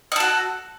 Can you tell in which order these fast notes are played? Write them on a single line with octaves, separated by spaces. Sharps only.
D#5 A4 F#4